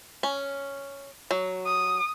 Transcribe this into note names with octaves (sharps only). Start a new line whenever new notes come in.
C#4
F#3
D#6